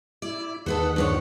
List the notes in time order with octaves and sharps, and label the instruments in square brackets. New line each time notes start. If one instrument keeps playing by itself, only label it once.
[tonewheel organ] E4 [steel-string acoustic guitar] D5
[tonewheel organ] D#2 D#3 F#5 [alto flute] G#4 [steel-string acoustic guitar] A4 B4 C5
[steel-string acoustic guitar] G2 F3 C#5